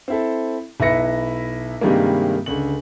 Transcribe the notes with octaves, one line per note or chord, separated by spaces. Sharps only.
C4 E4 A4
B1 E4 B4 E5 A#6 C#7
G2 C3 D#3 G3 G#3 A#3
C#2 D3 F#7